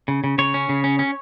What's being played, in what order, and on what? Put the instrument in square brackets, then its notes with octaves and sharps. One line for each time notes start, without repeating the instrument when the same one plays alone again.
[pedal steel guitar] C#3
C#3
C#3 C#5
C#4
C#3
C#4
C#4